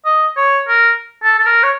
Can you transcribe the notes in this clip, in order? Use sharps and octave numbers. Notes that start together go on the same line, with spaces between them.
D#5
C#5
A#4
A4
A4
A#4
C#5